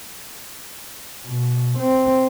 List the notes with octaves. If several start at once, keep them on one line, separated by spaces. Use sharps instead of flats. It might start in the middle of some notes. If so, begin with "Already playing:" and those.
B2
C4